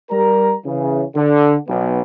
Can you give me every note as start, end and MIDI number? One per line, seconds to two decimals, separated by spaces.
0.11 0.55 55
0.11 0.55 70
0.11 0.55 82
0.66 1.03 49
0.66 1.03 52
1.16 1.55 50
1.69 2.00 35
1.69 2.00 59